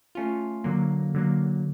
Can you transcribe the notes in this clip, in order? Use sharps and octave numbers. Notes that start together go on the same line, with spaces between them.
A3 C#4 F4
D3 F#3 A#3
D3 F#3 A#3